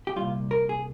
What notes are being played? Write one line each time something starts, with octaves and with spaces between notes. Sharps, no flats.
G4
C2 A#2 G3 F4
A#4
G#4